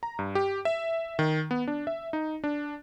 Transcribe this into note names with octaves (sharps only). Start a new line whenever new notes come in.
A#5
G2
G4
E5
D#3
B3
D4
E5
D#4
D4